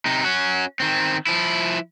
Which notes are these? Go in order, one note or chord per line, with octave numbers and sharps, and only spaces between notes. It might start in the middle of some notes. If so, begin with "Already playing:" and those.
C3 D#4
C#4 F#4
D#3 C4
F3 E4